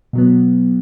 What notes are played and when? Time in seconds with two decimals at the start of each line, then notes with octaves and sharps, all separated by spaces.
0.13 B2 F#3 B3